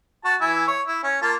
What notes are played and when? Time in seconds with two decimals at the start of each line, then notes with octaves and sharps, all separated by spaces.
0.25 F#4 A5
0.41 E3 E4 G#5
0.68 C#5
0.87 E4
1.03 C#4
1.22 A#3 F4 A5